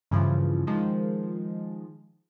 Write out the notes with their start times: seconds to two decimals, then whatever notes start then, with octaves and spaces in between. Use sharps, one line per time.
0.11 G2 C#3 E3 F3
0.67 D#3 F3 G#3